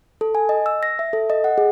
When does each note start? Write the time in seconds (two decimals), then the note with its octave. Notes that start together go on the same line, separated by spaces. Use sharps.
0.21 A4
0.35 G#5
0.49 D#5
0.66 E6
0.83 A#6
0.99 E5
1.13 A4
1.30 D#5
1.44 F#5
1.58 G#4